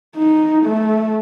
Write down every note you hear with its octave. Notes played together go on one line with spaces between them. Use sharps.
D#4
A3